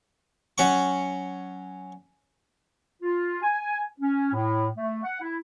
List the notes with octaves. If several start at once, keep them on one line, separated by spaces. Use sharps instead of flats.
F#3 C#4 F#5 C#6
F4
G#5
C#4
A2
A3
F#5
E4